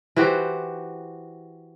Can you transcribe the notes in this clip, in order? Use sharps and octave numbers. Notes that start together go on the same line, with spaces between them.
E3 F#4 G4 C5